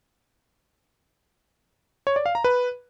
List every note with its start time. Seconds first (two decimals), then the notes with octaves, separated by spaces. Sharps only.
2.07 C#5
2.16 D5
2.26 F5
2.35 A#5
2.44 B4